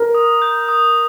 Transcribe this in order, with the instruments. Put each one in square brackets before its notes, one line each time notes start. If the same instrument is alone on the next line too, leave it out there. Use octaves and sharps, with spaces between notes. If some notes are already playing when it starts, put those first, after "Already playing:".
Already playing: [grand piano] A#4
[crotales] D#6
G6
D#6